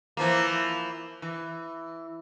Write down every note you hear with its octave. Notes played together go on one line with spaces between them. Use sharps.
E3 F3 A#3
E3